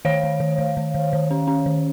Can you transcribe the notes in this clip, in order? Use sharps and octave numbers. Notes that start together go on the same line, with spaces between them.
D#3 C#5 F5
D#3
D#3
D#3
D#3
D#3
D#3
C#4
C#4
D#3